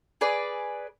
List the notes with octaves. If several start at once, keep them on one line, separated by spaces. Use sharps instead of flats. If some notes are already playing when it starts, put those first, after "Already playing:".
G#4 B4 D5